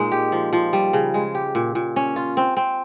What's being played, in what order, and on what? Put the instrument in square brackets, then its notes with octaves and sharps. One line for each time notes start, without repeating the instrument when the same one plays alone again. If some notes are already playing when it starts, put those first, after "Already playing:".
Already playing: [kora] A#2 G#3 D#4
G4
F3
F3
G3
C#3
G#3
G4
A#2
A#2
C#4
F4
C4
C4